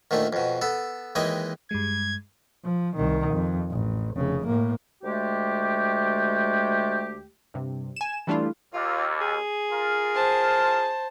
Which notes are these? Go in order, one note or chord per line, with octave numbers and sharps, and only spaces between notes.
D2 A#2 D#3 A3
F2 B2
B3 A4
D#2 E3 G#3 D#5 G5
G2 G3 G#3 G#6
F3
C2 D#3
F2
A1
F1 C#3
A2 A#3
D2 G#3 A3 G4
G2 C3
G#5 E7
E3 G3 A3 D4 E4 F4
D#2 F4
G#4
F4 A#4
C5 A5